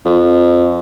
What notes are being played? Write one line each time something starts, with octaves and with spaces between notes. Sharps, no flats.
F2